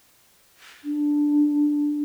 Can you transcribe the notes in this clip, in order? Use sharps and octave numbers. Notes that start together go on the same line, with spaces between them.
D4